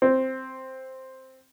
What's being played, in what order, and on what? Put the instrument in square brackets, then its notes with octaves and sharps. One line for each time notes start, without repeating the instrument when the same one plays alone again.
[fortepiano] C4